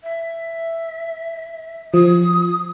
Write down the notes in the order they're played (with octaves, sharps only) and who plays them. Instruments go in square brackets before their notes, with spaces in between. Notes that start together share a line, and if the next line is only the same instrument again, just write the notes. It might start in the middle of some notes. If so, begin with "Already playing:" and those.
[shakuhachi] E5
[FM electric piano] F3 [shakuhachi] D#6